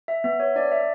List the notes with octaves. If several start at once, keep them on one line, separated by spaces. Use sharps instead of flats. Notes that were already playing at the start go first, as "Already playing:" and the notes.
E5
B3 E5
C#5
D4 D5
E5